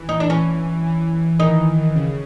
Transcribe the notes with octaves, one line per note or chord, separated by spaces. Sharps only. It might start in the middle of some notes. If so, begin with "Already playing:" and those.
Already playing: E3
D#4
D4
E3 C#4
E3
D#3 D#4
C#3